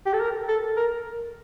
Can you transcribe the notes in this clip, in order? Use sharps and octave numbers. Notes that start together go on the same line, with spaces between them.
G4
A4
A#4
A4
A#4